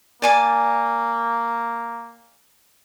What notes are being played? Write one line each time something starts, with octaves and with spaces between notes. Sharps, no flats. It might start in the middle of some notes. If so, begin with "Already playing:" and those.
A#3 D5 G#5 A5